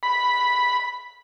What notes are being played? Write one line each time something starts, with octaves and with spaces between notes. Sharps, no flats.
B5